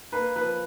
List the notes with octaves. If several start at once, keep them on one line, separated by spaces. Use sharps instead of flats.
A#3 B4
F3 B4